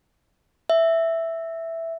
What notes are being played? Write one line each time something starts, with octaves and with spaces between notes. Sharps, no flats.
E5